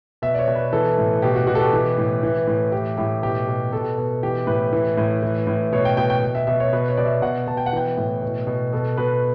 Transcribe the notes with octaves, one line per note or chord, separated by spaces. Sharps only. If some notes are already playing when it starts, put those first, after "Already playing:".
B2 E5
D5
C#5
B2
B4
E3 A4
A2
B2 G4
F#4
B2 F#4
A4
G4
E3
A2
E3
A2
E3 G4
A2 G4
B2 G4
B2
B2 A4
B2
E3 G4
A2 B4
E3
A2
E3
A2
B2 C#5
G5
B2 G5
G5
B2
E5
B2 E5
C#5
B2 B4
C#5
B2 D5
E5
B2 F#5
B2 A5
G5
F#5
E3 G5
A2
B2
B2
B2 A4
B2 B4